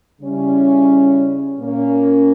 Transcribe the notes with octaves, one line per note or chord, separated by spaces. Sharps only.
C#3 G3 C#4 E4
A#2 A#3 C#4